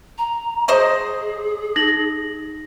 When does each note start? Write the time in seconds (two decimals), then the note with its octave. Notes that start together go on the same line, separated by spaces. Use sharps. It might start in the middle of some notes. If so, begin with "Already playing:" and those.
0.18 A#5
0.68 F#3 G#4 C5 D#5
1.76 D#4 A#6 F#7